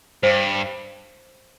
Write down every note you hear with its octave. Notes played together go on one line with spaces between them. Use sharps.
G2 C5